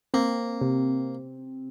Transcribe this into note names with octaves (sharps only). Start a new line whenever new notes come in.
A#3 C4
C3